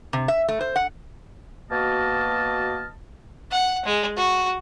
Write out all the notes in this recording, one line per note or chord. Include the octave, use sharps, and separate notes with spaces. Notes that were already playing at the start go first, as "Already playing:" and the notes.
C3
E5
A3
C5
F#5
B2 A#3 F#4 D#5 A5 F6
F#5
G#3
F#4